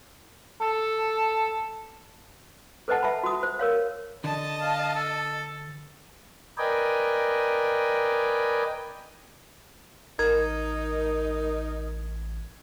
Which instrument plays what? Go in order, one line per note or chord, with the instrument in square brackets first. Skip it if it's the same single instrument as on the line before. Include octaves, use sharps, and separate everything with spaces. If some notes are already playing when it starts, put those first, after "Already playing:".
[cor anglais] A4
[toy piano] A4 B4 C5 D#5 F#5 A5
E5 A5 B5
F#4 D#6
C5
A#4 C#5 F5
[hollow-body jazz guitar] D3 [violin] D#5 A5
[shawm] F5
A4
[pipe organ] A#4 B4 D5 D#5 G5 G#5
[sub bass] A1 [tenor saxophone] D#4 [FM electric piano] A#4 [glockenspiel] G#6